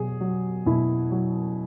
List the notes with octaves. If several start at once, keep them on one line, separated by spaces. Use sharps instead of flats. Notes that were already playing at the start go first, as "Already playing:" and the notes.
Already playing: B2 F#3 G#4
F#3
B2 E4
F#3